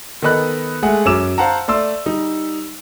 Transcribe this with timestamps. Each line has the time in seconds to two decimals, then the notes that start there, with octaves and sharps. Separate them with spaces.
0.22 D#3 B3 A4 D#5 B5 F#6
0.82 G#3 A3 G#4 F#5
1.05 F#2 C#4 F#4 D6 E6 E7
1.38 C5 F5 F#5 A5 A#5
1.68 A3 D5 C6 E6
2.06 G3 D#4